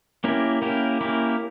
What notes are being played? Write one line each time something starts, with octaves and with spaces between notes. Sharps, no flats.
A#3 C#4 E4 G4 A#4
A#3 C#4 E4 G4 A#4
A#3 C#4 E4 G4 A#4